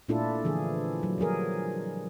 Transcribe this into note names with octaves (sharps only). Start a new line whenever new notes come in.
A#2 A3 D4 E4 F4 A4
D3 E3 F3 G#4
F#3
F3 G3 G#4 A#4